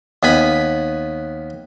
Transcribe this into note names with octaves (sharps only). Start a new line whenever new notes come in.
D#2 B3 G#5 B5